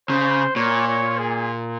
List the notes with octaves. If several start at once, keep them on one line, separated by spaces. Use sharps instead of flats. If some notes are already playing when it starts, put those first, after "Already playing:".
C#3 C5
A#2 C#5
C#5
G#4